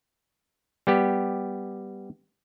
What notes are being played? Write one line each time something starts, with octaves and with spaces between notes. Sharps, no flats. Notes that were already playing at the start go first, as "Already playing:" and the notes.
G3 B3 G4